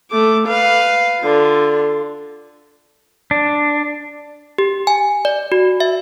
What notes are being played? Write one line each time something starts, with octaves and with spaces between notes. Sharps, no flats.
A3 D6
B4 F5
D3 F4
D4
G4
G#5
D5
F#4
E5